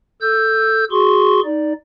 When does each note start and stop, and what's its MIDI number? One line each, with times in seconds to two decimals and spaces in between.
0.21 0.84 69
0.21 0.84 88
0.21 0.84 91
0.91 1.41 66
0.91 1.41 68
0.91 1.41 84
0.91 1.41 85
1.45 1.73 63
1.45 1.73 74